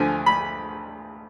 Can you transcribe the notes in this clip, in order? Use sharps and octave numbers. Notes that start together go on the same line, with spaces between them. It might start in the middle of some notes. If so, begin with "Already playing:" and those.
Already playing: D2 D3 F3 G#5
B5